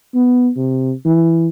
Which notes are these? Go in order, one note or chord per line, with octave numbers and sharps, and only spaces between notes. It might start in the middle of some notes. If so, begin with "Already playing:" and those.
B3
C3
E3